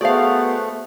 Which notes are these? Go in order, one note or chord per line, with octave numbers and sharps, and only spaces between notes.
A3 B3 F#4 G#4 C5 D5 F5